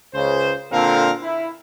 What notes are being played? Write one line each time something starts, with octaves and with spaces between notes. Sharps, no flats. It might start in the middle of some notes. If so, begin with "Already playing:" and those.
C#2 C#3 C5
A#2 D3 C4 A4 A#4 F5
E4